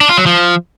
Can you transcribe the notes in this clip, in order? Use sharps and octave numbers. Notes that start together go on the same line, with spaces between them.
D4
F4
F#3
F3